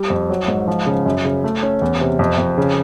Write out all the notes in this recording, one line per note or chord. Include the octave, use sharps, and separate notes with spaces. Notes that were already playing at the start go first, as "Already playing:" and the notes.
Already playing: G3
F2
F#3
G#2
F3
C#3
F#2
C#3
A3
C#4
E2
C3
F2
F2
C#3